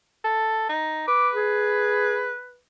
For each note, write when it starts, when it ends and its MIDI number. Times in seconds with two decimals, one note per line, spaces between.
0.24 0.66 69
0.69 1.05 63
1.07 2.59 71
1.07 1.28 86
1.34 2.30 68